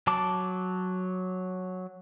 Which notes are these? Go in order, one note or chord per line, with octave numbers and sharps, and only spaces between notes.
F#3 A5 D6